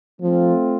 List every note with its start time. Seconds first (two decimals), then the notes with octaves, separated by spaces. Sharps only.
0.22 F3 A3 C4 F4